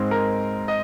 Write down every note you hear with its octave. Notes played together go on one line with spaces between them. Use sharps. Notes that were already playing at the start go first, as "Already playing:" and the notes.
Already playing: G#2 G#3 C4
A#4
D#5